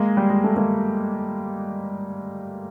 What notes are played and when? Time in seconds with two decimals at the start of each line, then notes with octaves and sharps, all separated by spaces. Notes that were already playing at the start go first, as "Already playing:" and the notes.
Already playing: G#3 A#3
0.17 G3
0.30 G#3
0.44 A3
0.56 G#3 A#3